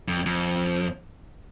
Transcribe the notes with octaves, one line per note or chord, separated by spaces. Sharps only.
F2
F2